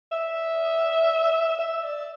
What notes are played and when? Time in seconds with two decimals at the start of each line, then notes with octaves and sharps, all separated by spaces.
0.12 E5
1.59 E5
1.83 D5